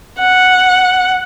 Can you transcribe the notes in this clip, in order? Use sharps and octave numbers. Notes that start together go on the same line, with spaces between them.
F#5